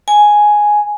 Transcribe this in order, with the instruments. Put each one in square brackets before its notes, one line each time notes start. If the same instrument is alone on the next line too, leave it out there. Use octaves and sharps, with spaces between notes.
[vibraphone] G#5